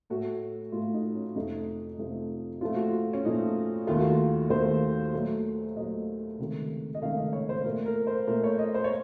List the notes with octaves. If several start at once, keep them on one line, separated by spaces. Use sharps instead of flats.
A2 A3 F#4
A2 A3 F4
D#4
C#4
F2 C3 F3 A3 D#4
F2 C3 F3 A3
A#2 F3 A3 F4
F#4
F4
C#4
A#2 F3 A3 D#4
D#2 D#3 A3 F4
F#4
F4
D#2 D#3 A3 C5
A#2 F#3 A3
A#2 F#3 A3 D#5
C#2 C3 D#3 A3
D#5
C#2 C3 D#3 A3 F5
D#5
C#5
C5
A#2 A3 A#4
A#4
C5
A#2 A3 A#4
C#5
D#5
C5
C#5